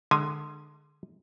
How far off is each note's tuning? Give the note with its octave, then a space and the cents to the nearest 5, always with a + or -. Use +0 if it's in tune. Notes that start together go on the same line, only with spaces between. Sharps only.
D3 +25 G#3 +0 G#5 +0